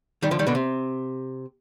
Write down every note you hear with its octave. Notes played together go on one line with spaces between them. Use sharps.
D#3 G3
D3 F3
D#3 G3
B2 D3
C3